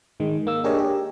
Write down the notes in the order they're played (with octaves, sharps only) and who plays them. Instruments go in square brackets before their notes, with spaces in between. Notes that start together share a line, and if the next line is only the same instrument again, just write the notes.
[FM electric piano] G#2 D#3 G#3
A#3 E6
D4 G4 G#4 A#4 C#5 D#5
G4